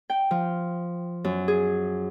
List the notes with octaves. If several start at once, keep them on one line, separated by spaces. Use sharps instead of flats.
G5
F3
F#2
G#4